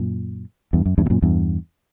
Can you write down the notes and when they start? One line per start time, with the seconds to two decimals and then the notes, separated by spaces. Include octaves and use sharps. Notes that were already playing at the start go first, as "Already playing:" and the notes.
Already playing: F#2 A#2
0.73 E2 G2
0.86 F#2
0.98 E2 G2
1.06 B2
1.10 F#2 A#2
1.22 E2 G2